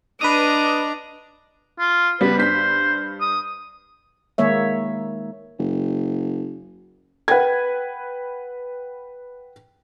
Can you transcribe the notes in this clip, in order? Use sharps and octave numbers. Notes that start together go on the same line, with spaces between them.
D4 B4 D#5 A#5 D#6
F4
C#3 G3 B3 B4
G2 C5 B6
D#6
D#3 G#3 A#3 C#5 E5
F#1
B4 F#5 G5 G#6